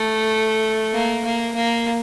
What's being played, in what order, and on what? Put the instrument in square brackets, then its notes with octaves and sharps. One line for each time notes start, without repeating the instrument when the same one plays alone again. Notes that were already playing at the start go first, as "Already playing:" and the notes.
Already playing: [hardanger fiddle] A3
A#3
A#3
A#3